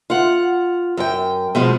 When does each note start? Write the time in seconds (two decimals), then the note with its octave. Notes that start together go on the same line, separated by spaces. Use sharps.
0.10 F4 F#5
0.97 F#2 G5
1.55 B2 F3 G#3